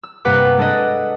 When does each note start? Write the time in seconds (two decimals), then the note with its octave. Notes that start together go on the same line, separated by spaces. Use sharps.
0.03 E6
0.25 G2 C3 A#3 B4 F#5 D6
0.58 G#3 D4 A4 B4 D#5